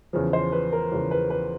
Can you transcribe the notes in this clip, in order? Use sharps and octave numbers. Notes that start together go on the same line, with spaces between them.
E2 C#3 F3
C5
B4
A#4
E2 C#3 F3
B4
B4